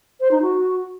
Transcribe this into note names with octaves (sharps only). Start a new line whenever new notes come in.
C5
D#4
F#4